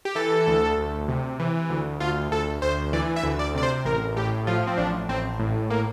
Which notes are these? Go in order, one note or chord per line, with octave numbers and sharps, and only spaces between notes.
G4
E3 A4
D2
D2
C3
E3
D2
D2 F4
D2 A4
D2 C5
E3 D5
E5
D2
D5
C3 D5
C5
A1 A#4
A2 G4
F3 F4
C4
A1 D4
A1 C4
A2
A#3